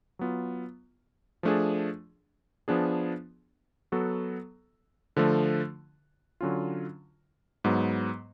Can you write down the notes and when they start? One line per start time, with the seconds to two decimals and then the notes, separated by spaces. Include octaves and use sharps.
0.19 F#3 B3 F4
1.43 F3 A3 D4 G#4
2.68 F3 B3 D4 G#4
3.92 F#3 B3 F#4 A4
5.16 D3 F3 A3
6.41 D3 F#3 C#4 F4
7.64 G#2 F#3 B3